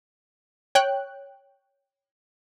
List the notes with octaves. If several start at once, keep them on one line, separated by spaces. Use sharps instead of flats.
C#5 G5 F#6